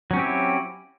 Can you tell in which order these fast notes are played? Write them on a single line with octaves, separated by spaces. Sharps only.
F#3 C#4 C4 G4 E4